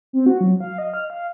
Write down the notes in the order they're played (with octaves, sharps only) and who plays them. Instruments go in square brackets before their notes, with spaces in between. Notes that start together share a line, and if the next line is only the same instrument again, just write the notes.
[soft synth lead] C4
F#4
F#3
F5
D#5
F6
F5